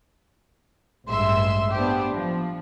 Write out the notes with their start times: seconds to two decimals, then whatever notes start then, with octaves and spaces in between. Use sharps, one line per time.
1.08 A1 G2 G#3 E5 C6 E6
1.72 B3 D4 G4 C5
2.14 F3